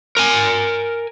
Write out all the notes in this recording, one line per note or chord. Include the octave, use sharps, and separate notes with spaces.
A#4 G#5